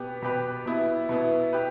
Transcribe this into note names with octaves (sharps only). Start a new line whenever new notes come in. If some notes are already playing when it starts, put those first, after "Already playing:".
Already playing: B2 B3 G4 B4
B2 B3 G4 B4
B2 B3 E4
B2 B3 E4
G4 B4